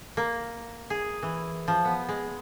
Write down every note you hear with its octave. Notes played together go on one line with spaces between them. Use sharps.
A#3
G#4
E3
F3
B3
G#3